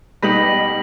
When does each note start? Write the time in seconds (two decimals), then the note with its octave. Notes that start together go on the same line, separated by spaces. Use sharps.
0.22 B2 G3 D#4 G4 B4 A#6 F#7